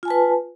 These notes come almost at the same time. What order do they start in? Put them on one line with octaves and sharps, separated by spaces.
F4 G#5 A5 B4